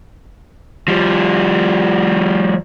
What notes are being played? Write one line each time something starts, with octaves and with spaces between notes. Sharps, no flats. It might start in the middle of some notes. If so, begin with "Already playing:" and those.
F3 G3